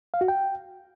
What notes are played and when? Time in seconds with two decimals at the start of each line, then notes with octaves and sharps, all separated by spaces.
0.14 F5
0.21 F#4
0.28 G5